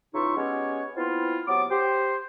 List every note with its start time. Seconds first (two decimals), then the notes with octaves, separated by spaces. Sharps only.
0.14 C#3 E3 D#4 F4 E5 C#6
0.36 G#3 B3 C#4 G4 C#5
0.97 B3 C4 E4 F4
1.47 C3 F#3 B3 D6
1.70 G4 C5